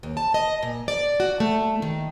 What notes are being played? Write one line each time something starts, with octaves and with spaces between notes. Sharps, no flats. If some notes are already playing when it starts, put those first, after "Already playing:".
D#2
A5
D#5
A#2
D5
F#4
A3
D#3